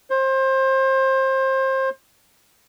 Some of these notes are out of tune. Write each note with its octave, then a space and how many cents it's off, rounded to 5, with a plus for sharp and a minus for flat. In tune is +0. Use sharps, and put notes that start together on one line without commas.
C5 +25